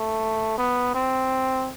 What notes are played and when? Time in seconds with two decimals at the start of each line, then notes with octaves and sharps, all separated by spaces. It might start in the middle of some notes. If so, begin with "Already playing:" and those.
Already playing: A3
0.58 B3
0.95 C4